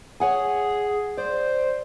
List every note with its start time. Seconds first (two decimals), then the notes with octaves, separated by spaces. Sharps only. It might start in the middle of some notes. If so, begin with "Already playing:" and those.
0.20 G#4 C#5 F#5 G#5
1.17 C5 D5